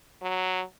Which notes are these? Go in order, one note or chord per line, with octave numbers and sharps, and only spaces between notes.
F#3